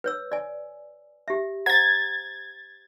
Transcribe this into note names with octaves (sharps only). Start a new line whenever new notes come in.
B4 C#5 E6
D5 G#5
G4 E5
C5 F#5 A#5 G#6 A6